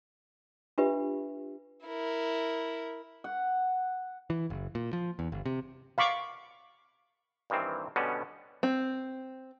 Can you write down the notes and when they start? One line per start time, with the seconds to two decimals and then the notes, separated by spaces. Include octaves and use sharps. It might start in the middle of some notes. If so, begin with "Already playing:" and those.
0.78 D4 F4 G4 B4 E5
1.85 E4 A#4
3.24 F#5
4.30 E3
4.50 F#1
4.75 A#2
4.93 F3
5.19 E2
5.32 G1
5.46 C3
5.98 F5 B5 C#6 D6
7.50 G2 D#3 E3 C4
7.96 B2 D3 G3 B3 C#4
8.63 C4